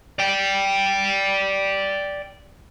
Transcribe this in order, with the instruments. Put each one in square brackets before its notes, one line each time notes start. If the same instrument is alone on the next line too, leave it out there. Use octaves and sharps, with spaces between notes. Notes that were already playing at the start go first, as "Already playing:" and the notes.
[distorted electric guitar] D5 G5